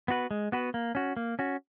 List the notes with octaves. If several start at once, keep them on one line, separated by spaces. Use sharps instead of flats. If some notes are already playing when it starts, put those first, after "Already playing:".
B3 F#4 B4
G#3
B3 F#4 B4
A#3
C#4 F#4
A#3
C#4 F#4